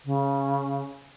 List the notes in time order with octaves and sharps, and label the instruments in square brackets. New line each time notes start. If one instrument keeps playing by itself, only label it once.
[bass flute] C#3